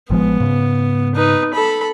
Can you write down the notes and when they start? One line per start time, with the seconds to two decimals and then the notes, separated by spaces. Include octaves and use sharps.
0.10 A1 F3 G#3 B3
0.40 G#2 C#3
1.15 D#4 B4
1.54 A4 B5